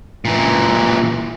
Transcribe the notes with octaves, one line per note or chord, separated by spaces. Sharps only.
A#2 E3